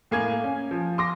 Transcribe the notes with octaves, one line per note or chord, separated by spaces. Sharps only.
A2 A#3 G#5 G#6
C#4
F3
C6 D6 A#6